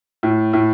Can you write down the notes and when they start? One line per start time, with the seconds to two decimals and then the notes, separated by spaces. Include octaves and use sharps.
0.23 A2
0.53 A2